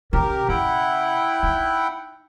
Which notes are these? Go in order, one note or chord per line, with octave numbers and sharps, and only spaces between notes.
C#3 G4 A#4
C#3 E4 F#5 G5
D#4